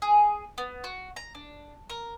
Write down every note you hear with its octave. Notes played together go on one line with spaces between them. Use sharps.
G#4
B3
F#4
A#5
D4
A#4